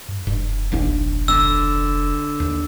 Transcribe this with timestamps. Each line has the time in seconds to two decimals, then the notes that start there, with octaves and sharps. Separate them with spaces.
0.09 G2
0.27 F1 G2
0.72 A#1 D#2 D4
1.28 D3 E6
2.40 D#2